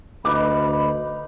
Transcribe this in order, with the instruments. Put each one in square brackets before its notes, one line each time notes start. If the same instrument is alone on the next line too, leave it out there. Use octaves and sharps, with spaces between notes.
[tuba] D2 [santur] D#4 B4 F5 [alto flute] B5 [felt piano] D6